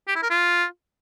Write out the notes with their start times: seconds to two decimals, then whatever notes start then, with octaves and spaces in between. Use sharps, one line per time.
0.08 G4
0.15 E4
0.22 A#4
0.30 F4